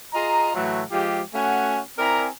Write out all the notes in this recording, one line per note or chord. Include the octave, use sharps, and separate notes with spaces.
F4 G#4 D#5 A#5
A2 E3 F#3 A3
F3 G#3 F4 G4
A3 C#4 F#4 F#5 G#5
C4 E4 A#4 D5 G#5 A#5